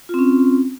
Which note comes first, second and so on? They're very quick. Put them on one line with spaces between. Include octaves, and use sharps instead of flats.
F4 C4 C#4